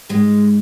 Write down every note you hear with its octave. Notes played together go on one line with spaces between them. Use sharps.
G#2 G#3